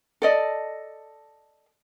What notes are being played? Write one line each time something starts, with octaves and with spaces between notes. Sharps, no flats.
A4 D5 D#5